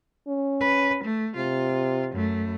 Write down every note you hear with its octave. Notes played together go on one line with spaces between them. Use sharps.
C#4
B4
A3
C3 F4
F#2 A3